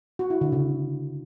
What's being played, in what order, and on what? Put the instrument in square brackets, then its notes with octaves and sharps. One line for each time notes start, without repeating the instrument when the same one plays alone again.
[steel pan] F#4
E4
D3
C#3